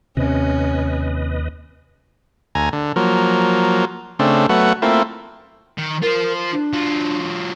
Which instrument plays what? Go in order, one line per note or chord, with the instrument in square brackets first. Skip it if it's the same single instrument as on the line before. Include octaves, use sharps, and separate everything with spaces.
[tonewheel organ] D#2 B4 D#5 [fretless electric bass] C3 [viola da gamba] C#4
[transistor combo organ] D2 G#5 A#5
D3
F3 F#3 A#3
C#3 A3 C4 D4
F#3 A3 B3 F#5
A3 A#3 C4 E4 F4
[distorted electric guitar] D#3
[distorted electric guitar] F4 C5 [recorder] A#4
[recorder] D4
[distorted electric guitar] F#3 F4